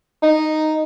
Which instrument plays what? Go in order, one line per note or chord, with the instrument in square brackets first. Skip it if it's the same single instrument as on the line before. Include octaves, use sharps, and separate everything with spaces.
[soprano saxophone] D#4